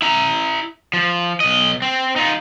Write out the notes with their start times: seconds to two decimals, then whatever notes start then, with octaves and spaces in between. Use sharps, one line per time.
0.02 E4 A#5
0.93 F3
1.40 B1 D#5
1.82 C4
2.16 D#4 F4